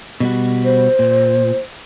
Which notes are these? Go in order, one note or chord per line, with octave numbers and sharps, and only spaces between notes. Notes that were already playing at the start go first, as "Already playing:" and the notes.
B2 G3 F#4
C5
A#2